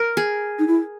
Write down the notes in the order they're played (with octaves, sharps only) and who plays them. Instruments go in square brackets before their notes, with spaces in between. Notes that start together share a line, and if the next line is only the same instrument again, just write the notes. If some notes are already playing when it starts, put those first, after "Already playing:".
Already playing: [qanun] A#4
G#4
[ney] D#4
E4